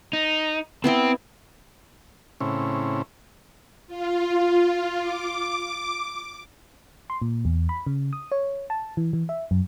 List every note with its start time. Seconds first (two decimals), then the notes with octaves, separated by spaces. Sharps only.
0.13 D#4
0.84 B3 C4 E4 E5 G5
2.41 A2 C#3 C4 C#4 E4
3.87 F4
4.99 D6
7.10 C6
7.22 A#2
7.45 E2
7.69 B5
7.87 C#3
8.13 D#6
8.32 C#5
8.70 A5
8.97 E3
9.13 E3
9.29 E5
9.51 F#2